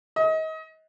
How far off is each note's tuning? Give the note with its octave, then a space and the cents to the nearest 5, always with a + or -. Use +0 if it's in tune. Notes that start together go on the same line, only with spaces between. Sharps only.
D#5 +30